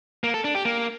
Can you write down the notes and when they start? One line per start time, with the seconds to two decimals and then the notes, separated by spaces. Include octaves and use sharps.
0.24 A#3
0.34 A4
0.44 D4
0.55 G4
0.65 A#3